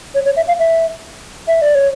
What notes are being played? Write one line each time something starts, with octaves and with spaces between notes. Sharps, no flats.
C#5
C#5
E5
F5
E5
E5
D5
C#5